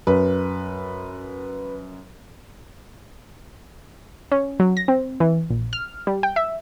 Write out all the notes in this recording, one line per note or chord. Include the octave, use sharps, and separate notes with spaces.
F#2 B4
C#4
F#3
A#6
C4
E3
A#1
F6
G3
G5
E5